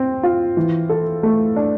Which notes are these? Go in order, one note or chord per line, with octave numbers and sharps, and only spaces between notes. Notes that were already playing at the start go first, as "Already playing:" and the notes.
Already playing: C4
F4
E3
A4
A3
D4